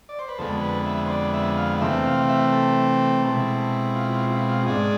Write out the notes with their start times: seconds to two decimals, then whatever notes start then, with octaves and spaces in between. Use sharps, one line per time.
0.09 D5
0.19 C5
0.28 B4
0.38 F2 D3 G#3 B3 A4
0.62 B4
0.86 E5
1.06 C5
1.10 D5
1.33 E5
1.57 F5
1.81 C3 E3 A3 C4 E5
2.06 F5
2.29 E5
2.52 A4
3.23 B2 G#3 C4 E4
3.95 F4
4.13 F4
4.30 E4
4.49 F4
4.66 G#2 G#3 D4 G#4